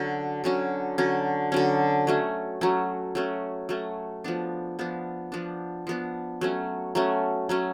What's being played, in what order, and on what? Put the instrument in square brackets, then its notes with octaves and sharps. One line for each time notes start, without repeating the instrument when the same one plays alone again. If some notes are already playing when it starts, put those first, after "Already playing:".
Already playing: [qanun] D3 F#3 C#4
D3 F#3 C#4
D3 F#3 C#4
D3 F#3 C#4
F#3 A3 C#4
F#3 A3 C#4
F#3 A3 C#4
F#3 A3 C#4
F3 B3 D4
F3 B3 D4
F3 B3 D4
F3 B3 D4
F#3 A3 C#4
F#3 A3 C#4
F#3 A3 C#4